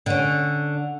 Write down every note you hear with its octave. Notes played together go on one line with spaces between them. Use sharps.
D3 C#4